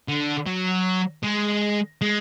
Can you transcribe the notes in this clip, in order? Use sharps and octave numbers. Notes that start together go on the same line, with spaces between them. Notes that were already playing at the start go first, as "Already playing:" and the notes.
D3
F#3
G#3
G#3